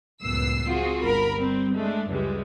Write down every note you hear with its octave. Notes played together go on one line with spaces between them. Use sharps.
C#2 F#2 A2 B3 E6 C7
C4 F4 F#4 G#4
G1 A#4 B5
G3 C4
G#3 A3 D4
C#2 F#2 E3 G3 G#3